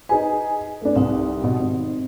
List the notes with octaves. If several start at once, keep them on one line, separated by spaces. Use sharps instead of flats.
D#4 G#4 B4 G#5
A3 D4
C2 C4 D#4
B2
G#1